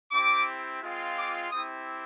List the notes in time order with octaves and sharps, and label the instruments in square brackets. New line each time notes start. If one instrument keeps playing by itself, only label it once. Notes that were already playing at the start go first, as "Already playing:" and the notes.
[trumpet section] C4 E4 G4 D6
G#3 C4 F4
D6
C4 E4 G4 D#6